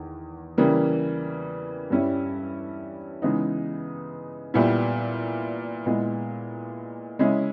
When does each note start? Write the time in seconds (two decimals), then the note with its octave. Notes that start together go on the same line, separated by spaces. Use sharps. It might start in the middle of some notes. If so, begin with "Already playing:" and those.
Already playing: E2 D#3
0.58 C#3 E3 G3 A#3
1.90 G2 G3 C#4 E4
3.22 C#3 E3 G#3 B3 D#4
4.54 A#2 G3 B3 E4
5.86 A#2 G#3 B3 E4
7.19 C#3 G#3 C#4 E4